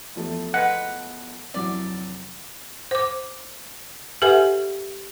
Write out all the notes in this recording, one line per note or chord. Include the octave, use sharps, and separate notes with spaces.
E2 F3 A3
G#3 B4 F#5
F1 F#3 E4 D5
C5 D6
G4 A4 B4 E5 F#5 G#5